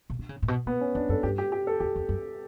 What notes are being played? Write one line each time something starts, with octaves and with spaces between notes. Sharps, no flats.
B2
D3
C#3
A2
B2
B2 B3
C#4
E2 D4
F#2 A4
G2 G4
G4
G4
A4
E2 G4
E2
F#2